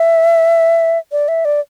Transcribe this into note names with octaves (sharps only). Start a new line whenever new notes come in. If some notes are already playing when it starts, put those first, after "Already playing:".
Already playing: E5
D5
E5
D5